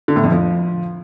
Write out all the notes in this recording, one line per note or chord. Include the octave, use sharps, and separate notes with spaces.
D3
A2
F2
F3